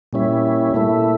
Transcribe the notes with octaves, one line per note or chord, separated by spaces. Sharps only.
A#2 G3 C#4 E4
A#2 A3 E4